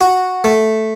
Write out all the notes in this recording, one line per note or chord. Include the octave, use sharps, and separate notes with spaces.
F#4
A3